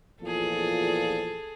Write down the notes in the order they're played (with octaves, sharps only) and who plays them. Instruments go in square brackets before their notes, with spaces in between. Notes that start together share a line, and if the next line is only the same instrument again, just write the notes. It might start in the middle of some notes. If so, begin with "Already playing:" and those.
[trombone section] E2 A#2 F3 [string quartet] G#4 A4